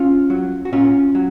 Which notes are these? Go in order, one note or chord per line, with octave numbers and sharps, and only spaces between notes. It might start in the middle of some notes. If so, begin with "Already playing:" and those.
Already playing: C#4 F4
F#3
F#4
A#2 C#4 F4
F#3